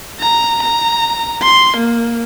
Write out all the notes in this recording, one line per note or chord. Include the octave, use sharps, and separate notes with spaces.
A#5
A#5
C6
A#3